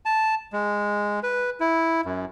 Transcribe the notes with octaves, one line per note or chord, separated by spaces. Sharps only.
A5
G#3
B4
E4
F#2